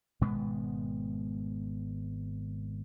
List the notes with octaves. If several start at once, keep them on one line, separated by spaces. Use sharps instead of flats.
G#1 B2 G#3 B3